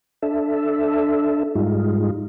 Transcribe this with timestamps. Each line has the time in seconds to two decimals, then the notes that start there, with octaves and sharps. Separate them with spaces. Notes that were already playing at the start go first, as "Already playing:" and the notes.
0.22 D4 A4 E5
1.55 G#2 G3 G#3 D#4 F4